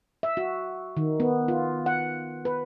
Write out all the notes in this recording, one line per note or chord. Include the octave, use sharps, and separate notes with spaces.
E5
F#4
D#3
B3
F4
F#5
B4